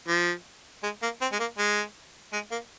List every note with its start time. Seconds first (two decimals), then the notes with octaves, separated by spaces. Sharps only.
0.08 F3
0.83 G#3
1.03 A#3
1.21 C4
1.32 G#3
1.39 A#3
1.58 G#3
2.33 G#3
2.51 A#3